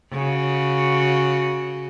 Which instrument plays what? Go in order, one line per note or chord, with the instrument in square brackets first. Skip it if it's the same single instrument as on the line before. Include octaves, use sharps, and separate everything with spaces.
[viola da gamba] C#3 F#4